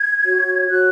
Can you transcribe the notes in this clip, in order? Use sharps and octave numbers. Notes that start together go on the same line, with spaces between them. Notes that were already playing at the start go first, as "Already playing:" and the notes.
Already playing: G#6
F#4 C#5
F#4 C#5 F#6